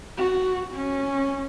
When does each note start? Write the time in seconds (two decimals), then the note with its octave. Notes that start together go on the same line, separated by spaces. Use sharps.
0.17 F#4
0.74 C#4